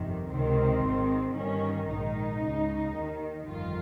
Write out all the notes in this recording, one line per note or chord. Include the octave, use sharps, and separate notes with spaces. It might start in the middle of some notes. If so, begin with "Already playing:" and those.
Already playing: G1 F2 C3 D#3
C#2 C3 D#3 C4
G#1 G#2 D#3
G1 G2 D#3 C#4
A#1 G#2 D#3 D#4
C#2 C#3
D#2 D#3
G1 F2 D#3 F4